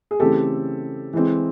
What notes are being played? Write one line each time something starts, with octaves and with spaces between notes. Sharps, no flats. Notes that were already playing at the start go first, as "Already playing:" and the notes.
G#4
C#3 E3 A3 C4 G4 A4
E3 G#3 C4